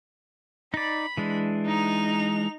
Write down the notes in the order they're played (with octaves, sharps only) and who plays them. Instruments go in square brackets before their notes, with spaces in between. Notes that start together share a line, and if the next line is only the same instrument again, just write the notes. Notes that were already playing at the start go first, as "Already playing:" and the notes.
[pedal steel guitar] D#4 D5 [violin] B5
[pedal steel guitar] E3 G#3 D4
[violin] D#4 F7